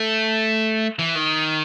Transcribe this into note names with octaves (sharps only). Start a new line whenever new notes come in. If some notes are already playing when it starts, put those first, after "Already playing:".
Already playing: A3
E3
D#3